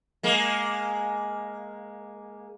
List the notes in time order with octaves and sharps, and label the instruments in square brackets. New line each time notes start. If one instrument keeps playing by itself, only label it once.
[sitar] G#3 A#3